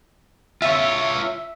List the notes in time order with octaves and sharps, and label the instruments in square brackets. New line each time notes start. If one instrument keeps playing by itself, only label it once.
[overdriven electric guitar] F4 C#5 [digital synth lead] E5